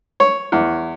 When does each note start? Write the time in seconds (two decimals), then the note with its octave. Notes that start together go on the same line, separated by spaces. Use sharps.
0.20 C#5
0.52 E2